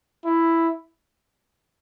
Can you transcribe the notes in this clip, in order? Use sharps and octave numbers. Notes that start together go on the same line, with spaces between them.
E4